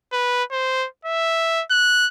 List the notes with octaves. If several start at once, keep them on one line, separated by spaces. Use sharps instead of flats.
B4
C5
E5
F#6